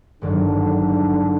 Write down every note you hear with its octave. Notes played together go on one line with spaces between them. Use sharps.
G#1 G2 D3 D#3 F#3